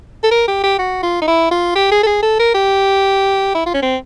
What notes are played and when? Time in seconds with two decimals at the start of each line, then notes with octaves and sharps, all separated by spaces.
0.24 A4
0.31 A#4
0.48 G4
0.64 G4
0.79 F#4
1.03 F4
1.21 D#4
1.28 E4
1.51 F4
1.75 G4
1.92 G#4
2.03 A4
2.07 G#4
2.23 A4
2.39 A#4
2.55 G4
3.55 E4
3.66 F4
3.74 C#4
3.82 C4